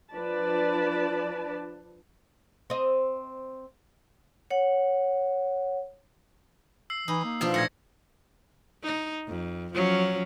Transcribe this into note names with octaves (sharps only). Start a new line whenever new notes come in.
F3 D4 B4 D5 A5
C4 D#5
C#5 F#5
E6 C7
E3 D#4
A#3
B2 F3 D4 F4
A#2 A3 G#6 A#6 C#7
D#4
F2
F3 F#3 C#4